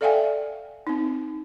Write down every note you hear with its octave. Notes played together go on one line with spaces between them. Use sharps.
A4 D5 E5 F5 G5 G#5
C4 D#4